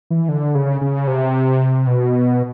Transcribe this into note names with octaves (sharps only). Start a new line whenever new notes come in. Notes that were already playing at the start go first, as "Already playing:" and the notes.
E3
D3
C#3
C#3
C3
B2